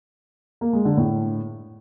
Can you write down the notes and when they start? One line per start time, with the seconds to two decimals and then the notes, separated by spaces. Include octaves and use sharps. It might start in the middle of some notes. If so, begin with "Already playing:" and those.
0.61 A#3
0.73 G#3
0.85 D3
0.97 A2